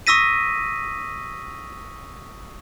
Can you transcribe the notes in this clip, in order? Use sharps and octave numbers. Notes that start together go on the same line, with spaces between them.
C#6 D#6 E6 A#6 B6 D#7